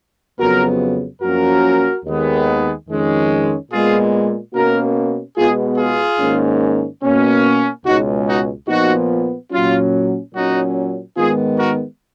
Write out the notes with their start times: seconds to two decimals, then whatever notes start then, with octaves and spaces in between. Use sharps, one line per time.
0.39 F2 C#3 F#3 B3 F#4 A#4
1.21 F#2 F3 A#3 C#4 F#4 A#4
2.04 D#2 D#3 G#3 B3
2.88 F2 D#3 G#3 C#4
3.71 A#2 G#3 B3 F4 G#4
4.53 B2 A#3 C#4 F#4 A#4
5.37 B2 G#3 B3 F4 G#4
5.78 F4 G#4
6.19 G#2 D#3 A#3 C#4
7.03 B2 A#3 C#4
7.85 C#2 B2 G#3 C#4 D#4 F#4
8.26 D#4 F#4
8.68 A#2 F3 B3 D#4 F#4
9.51 A#2 F#3 C#4 F4
10.34 A#2 F#3 C#4 D#4 F#4
11.17 G#2 D#3 G#3 B3 F4 G#4
11.58 F#4 A#4